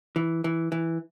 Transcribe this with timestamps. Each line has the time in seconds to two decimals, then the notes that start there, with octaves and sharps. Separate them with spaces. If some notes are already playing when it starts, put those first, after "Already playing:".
0.16 E3
0.44 E3
0.72 E3